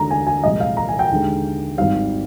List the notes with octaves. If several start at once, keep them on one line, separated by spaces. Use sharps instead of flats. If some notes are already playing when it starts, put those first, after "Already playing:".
Already playing: D#2 D3 G#3 A#5
G#5
G#5
C2 A#2 F3 G#3 D#5
F5
A#5
G#5
G5
D#2 D3 G#3
G#1 G#2 D#3 G3 F5